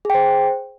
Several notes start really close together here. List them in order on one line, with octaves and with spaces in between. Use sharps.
G#4 G5 C5